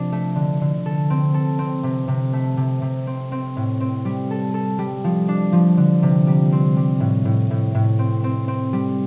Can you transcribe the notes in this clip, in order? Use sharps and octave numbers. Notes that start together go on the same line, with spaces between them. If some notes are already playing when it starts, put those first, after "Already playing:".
Already playing: C3 F3 D4
A3
D3
D3
A4
C4
A4
C4
C3
C3
A3
C3
C3
C4
C4
A2
C4
G3
A4
A4
G3
F3
D4
F3
D3
C3
G3
C4
G3
A2
A2
A2
A2
C4
C4
C4
G3